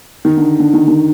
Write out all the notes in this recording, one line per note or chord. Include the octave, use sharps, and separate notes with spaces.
D#3
D3
D3
D#3
D#3